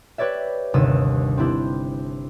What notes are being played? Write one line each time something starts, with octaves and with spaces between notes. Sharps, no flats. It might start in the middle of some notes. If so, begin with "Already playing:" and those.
G4 B4 C#5 D5 E5
G1 D#2 C3 D#6 E6
C4 D4 E4 G4